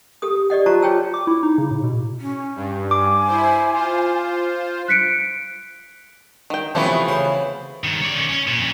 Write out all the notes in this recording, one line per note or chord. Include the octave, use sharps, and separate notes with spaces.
G4 A4 D#6
G4 D5 D#5 F#5
F4 F#4 C5 A5 A#5 C#6
F4 G#4 C#5 G5 A5 E6
D6
E4
D#4
C#3
A2
B2
C#4
G2
G#5 D6
E4 C5
F4 C5
F#6 B6 C#7 D7
D#3 G5
C3 E3 F3 A3 B3 C#4 F#4 B4
C#3 C5 C6
G2 D#3
C#5 D5
D#3 C#4
C#4
A#2
F2 C#4